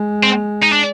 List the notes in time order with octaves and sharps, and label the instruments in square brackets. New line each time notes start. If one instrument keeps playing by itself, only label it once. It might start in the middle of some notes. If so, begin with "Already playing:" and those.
Already playing: [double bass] G#3
[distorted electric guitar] C4
D#4
D4